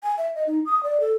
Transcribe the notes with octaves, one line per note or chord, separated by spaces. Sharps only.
G#5
E5
D#5
D#4
D#6
D5
A4